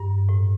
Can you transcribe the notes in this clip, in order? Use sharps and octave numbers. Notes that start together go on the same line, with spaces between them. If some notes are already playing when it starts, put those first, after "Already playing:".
Already playing: G2
A2